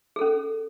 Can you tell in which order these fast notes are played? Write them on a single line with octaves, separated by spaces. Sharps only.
G#4 A4 C#4